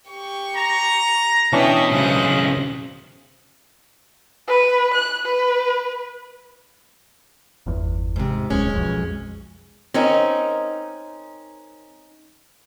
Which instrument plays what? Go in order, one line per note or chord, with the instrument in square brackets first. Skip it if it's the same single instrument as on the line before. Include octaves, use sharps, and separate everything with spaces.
[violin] G4 C#6
[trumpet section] A#5
[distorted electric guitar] B2 [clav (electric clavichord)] E3 C#4 D4 [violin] E4 G5 [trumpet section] D#5
[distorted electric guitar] B1 C#3 [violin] C5 F#6
[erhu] B4
F#6
B4
[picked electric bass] G1 E2
[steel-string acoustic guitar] G#2 C3
[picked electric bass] D1 B1 [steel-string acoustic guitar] G#3 C#4
[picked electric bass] B1 F2
[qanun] C4 A#4 [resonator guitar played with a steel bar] C#4 D#4